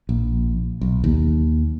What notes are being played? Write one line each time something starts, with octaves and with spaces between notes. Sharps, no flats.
A#1
B1
D#2